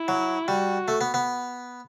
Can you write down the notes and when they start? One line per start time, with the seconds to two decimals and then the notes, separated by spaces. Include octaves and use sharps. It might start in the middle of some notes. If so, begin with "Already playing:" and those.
Already playing: E4
0.08 F#3
0.48 G3 F#4
0.88 A3
1.01 B3
1.14 B3